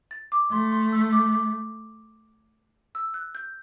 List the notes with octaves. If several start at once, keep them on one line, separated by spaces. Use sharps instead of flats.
A6
D6
A3 C6
C6
E6
D6
D6
E6
F#6
G6